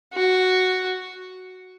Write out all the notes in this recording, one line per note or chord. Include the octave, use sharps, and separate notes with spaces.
F#4